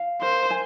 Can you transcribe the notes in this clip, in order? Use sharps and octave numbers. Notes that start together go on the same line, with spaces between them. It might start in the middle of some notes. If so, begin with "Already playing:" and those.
Already playing: F5
A#4 C5
G#5